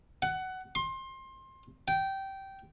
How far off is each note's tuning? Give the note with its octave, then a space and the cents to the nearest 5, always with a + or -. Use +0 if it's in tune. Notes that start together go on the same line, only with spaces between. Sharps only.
F#5 +15
C6 +25
G5 -15